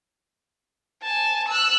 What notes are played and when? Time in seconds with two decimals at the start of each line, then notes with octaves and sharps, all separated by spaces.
1.03 G#5 A5
1.48 E6 F#6